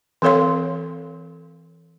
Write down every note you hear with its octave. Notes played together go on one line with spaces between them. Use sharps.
E3 C4 A4 C#5 F5 C6